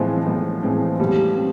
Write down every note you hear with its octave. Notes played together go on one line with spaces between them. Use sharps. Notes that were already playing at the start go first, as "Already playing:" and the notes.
Already playing: A2 E3 F3 G#3 C4
B1
A2 E3 G#3 C4
B1 G3
C4